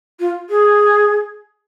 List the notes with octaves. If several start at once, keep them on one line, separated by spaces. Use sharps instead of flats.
F4
G#4